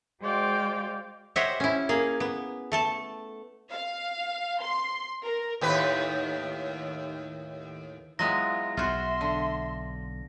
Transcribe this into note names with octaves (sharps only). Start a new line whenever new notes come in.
G#3 F#4 C5 D5 F5 G5
G4 C5 C#5 D#5 E5 F#5
C#4 E4
A#3 G#4
B3
A3 A4 A5
F5
C6
A#4
D#2 A2 B4
F#3 G#3 B3 E4 F4 A#6
B1 F4 F#4 E5 C6
D3